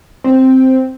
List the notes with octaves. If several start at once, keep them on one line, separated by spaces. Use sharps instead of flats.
C4